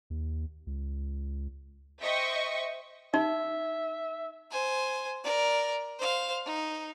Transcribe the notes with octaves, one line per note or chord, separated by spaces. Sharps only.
D#2
C#2
C5 D#5 E5 G5 C#6
D#4 E5
C5 G#5
A#4 D5
C5 F5
D#4